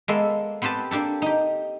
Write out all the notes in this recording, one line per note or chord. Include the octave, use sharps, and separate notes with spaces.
G#3 A#3 B3 A4 E5
B3 C4 G4 B4 A5
A#3 D4 G4 A4
D#4 G4